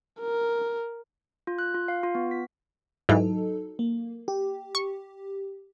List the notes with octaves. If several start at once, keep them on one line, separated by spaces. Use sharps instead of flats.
A#4
F4
F#6
F4
F5
F4
B3
B6
G#2 E3 F#3 D#4 A4
A#3
G4
C#6